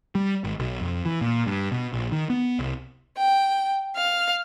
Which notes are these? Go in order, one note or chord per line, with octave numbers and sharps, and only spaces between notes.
G3
G#1
B1
F2
E3
A#2
G2
B2
A#1
D#3
B3
C2
G5
F5